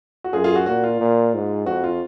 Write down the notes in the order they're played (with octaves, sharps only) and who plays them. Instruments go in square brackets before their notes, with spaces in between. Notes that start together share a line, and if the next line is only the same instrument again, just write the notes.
[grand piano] F#4
[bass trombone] F#2 [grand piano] F4 G#4
[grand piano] F4 G#4
F#4
[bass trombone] A#2 [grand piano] F#4
[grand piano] F4
[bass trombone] A#2
G#2
[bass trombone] F2 [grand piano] F#4
[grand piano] F4